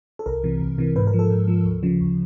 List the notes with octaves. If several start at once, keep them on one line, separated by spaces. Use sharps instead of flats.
A4
C2 A#4
C3 E3
C2
C3 E3
G#2 B4
A#4
F3
A4
G#2
F3
D2
C#3 F3
D2